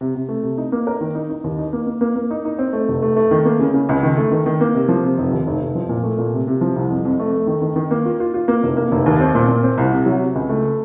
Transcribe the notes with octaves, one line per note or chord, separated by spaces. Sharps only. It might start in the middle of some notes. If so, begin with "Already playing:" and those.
C3
C3
A3
C3
D#4
A#3
A#4
D#3
D#4
D#4
D#2
D#4
A#3
A#3
A#3
A#3
D#4
D#4
C4
A3
F1
A3
A3
D#3
A#3
C#3
C#3
C#2
D#3
A3
D#3
D#3
A#3
C3
F3
C3
F1
D#2
F1
F1
F3
A#2
A3
A#2
C3
C3
F3
C2
F2
F2
A3
A3
D#3
D#3
D#3
A#3
F4
F4
F4
A#3
F1
A#3
F1
D#2
C4
A#2
A#2
C4
C2
C3
F#3
C3
C#2
A3